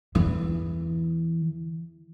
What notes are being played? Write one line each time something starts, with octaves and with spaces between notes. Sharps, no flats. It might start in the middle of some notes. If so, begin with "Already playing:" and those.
E2 E3